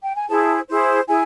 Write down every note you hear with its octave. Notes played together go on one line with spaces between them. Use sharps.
G5
G#5
E4 G#4 C5 A5
E4 G#4 C5
E4 G#4 G#5